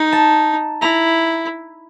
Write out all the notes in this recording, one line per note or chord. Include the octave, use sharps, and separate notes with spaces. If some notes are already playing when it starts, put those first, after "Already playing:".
Already playing: D#4
A5
E4 A#5